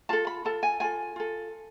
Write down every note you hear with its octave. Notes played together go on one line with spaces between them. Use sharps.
F4 A4 A5
B5
F4 A4 A5
G#5
F4 A4 G#5
F4 A4